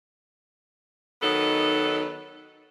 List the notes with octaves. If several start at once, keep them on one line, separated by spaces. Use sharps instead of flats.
D#3 F#3 B3 D#4 A4